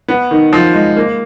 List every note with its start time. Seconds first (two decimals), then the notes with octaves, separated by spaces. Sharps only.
0.08 B3
0.31 D#3
0.53 F3
0.74 G#3
0.97 A#3